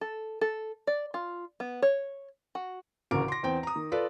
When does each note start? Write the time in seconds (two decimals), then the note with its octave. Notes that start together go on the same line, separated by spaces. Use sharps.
0.01 A4
0.41 A4
0.87 D5
1.14 F4
1.60 B3
1.82 C#5
2.55 F#4
3.11 A1 D2 C#3 A#4 D6 D7
3.28 C6 A#6
3.43 E2 C4 G5
3.63 A#5 D#6
3.76 D#3
3.92 F4 A4 B4 D5